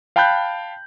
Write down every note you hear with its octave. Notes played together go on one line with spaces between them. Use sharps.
F5 G5 A5 B5 F#6 G6